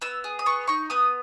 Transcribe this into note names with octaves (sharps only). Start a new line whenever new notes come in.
B3 E6
G#4
D#6
B3 C#6
D#4 C#6
B3 D#6